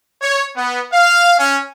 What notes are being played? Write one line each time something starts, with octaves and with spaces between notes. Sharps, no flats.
C#5
B3
F5
C#4